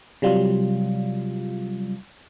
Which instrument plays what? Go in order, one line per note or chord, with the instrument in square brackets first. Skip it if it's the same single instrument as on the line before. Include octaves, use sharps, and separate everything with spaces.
[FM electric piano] C3 F#3 G3 F4